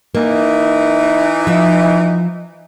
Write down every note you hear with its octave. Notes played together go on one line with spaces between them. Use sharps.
E3 A#3 D#4
F3 E5